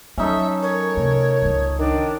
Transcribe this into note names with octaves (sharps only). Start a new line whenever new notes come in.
F#3 C#4 D#4 A4 E5
A#4 C#5
C3 A3
G1 C#2
D#3 D4